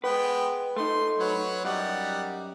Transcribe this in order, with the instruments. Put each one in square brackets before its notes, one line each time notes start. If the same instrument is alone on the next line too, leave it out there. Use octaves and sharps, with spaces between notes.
[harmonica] G#3 B3 G5 [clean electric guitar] B4
[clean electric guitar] A3 D#4 [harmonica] C6
[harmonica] F#3 B4 C#5
[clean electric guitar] F#2 [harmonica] G3 D#4 F#5